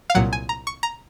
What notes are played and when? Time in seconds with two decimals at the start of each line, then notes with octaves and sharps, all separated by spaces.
0.10 F5
0.15 C2 A#2 F#3 F#5
0.33 G#5
0.49 A#5
0.67 C#6
0.83 A#5